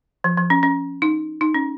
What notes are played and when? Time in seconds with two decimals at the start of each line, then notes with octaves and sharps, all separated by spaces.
0.24 F3
0.37 F3
0.50 C#4
0.63 C#4
1.02 D#4
1.41 D#4
1.54 C#4